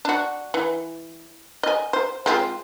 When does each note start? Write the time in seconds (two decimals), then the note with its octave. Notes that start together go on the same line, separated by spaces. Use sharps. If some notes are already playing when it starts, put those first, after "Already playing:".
0.05 D4 F#4
0.54 E3
1.63 D#5 G#5
1.93 C5
2.26 G#3 C4 F4